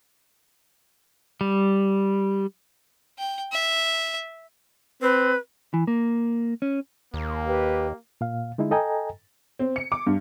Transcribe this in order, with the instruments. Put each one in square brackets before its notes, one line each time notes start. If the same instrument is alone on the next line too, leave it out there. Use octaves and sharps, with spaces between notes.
[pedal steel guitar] G3
[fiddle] G5
E5
[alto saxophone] C4 [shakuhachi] B4
[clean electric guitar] E3
A#3
C#4
[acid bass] D#2 [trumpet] A#3
[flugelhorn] G4 [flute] B4
[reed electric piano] A#2 F5
D3 G#3 D#4 E4
A4 D#5 G5 G#5 A#5
[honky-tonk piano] C4
C#7
D6
G2